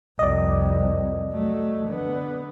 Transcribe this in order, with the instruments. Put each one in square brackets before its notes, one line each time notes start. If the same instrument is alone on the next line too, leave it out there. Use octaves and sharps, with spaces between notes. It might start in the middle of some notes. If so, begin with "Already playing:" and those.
[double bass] C2 F2 [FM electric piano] D5 D#5
[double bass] F#3 A3
D3 B3